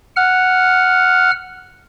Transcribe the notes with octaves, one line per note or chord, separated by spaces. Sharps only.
F#5 F6